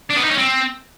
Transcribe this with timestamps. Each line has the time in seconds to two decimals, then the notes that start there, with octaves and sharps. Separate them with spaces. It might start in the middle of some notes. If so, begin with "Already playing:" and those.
0.10 D4
0.17 B3
0.24 D#4
0.31 C#4
0.37 C4